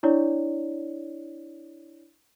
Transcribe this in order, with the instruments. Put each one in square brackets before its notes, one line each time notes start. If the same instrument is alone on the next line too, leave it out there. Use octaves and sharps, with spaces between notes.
[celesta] D4 E4 C#5 D5